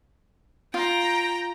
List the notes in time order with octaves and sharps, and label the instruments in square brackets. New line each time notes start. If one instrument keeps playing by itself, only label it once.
[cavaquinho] F4 [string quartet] G5 A#5